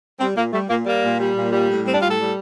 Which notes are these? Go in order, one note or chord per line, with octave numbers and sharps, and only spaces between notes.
G3 C4
A#2 A#3
G3 A3
A#2 A#3
G3 A#3
A#2
G3
A#2
G3
A2
G3 C4
D4
A2 F4
A4
G3